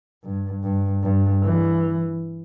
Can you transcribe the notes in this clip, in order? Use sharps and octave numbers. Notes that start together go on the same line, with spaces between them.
G2
G2
G2
E3